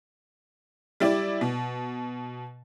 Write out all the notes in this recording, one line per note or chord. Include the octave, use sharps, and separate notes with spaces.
G3 E4 D5
B2